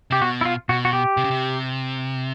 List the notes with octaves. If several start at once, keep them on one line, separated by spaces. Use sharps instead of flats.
C3 G4
B2 F#4
E4
F4
B2 F#4
F#4
G4
C3
C#3
C3